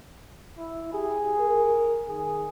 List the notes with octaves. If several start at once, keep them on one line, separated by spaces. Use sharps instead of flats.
E4
G4 G#4
A#4
D#3 G#4